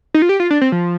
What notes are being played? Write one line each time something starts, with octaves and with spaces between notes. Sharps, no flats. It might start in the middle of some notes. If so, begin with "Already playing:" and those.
D#4
F4
G4
F4
D4
C4
F3